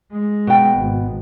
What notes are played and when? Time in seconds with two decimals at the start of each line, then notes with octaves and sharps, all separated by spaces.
0.13 G#3
0.47 B2 G5
0.79 G#1